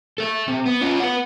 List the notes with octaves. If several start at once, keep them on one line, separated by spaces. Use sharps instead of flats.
A4 E5
C3
B3
C#4 F4
B4 F#5